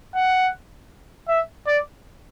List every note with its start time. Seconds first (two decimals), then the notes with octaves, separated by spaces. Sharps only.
0.15 F#5
1.28 E5
1.67 D5